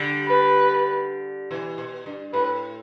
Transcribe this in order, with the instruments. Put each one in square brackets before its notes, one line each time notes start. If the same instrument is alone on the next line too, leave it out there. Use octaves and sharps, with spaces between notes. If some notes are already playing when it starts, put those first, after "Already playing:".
Already playing: [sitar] D3 G3
[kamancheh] B4
[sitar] B2 E3
B2
G2
[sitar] A2 [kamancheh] B4